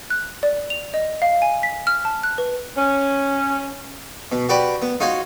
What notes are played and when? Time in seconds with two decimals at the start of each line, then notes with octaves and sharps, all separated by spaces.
0.10 F#6
0.43 D5
0.70 F7
0.94 D#5
1.22 F5
1.42 G#5
1.63 B6
1.87 F6
2.05 A5
2.24 F#6
2.38 B4
2.76 C#4
4.32 B2
4.49 F#4 G4 B4 D5
4.82 B3
5.00 D#4 F4 F#4 C#5 C6